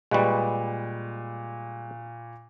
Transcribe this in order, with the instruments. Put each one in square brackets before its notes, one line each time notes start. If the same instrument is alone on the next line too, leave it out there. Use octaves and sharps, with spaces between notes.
[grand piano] A#2 B4 C#6 [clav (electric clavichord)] G3 G#3